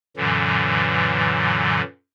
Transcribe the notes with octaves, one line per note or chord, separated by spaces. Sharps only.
F#2 A#2 D3 E3 F#3